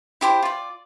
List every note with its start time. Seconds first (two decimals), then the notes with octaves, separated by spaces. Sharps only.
0.21 E4 G4 C5
0.43 F4 D5